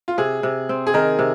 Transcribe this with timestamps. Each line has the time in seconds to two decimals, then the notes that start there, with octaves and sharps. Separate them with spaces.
0.08 F4
0.18 C3 G#4
0.43 C3
0.69 C4
0.87 G#4
0.94 D#3 A#4
1.19 C3